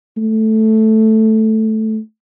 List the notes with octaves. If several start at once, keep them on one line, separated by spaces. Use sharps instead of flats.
A3